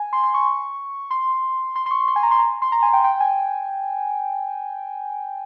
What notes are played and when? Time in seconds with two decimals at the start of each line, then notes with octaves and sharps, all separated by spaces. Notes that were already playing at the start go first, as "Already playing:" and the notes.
Already playing: G#5
0.13 C6
0.23 C6
0.34 C#6
1.11 C6
1.76 C6
1.86 C6
1.91 C#6
2.08 C6
2.16 G#5
2.23 A#5
2.31 C6
2.39 A#5
2.62 C6
2.72 A#5
2.82 G#5
2.93 G5
3.04 G5
3.20 G#5